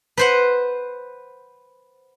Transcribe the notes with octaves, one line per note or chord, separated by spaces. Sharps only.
B4 C5 F#5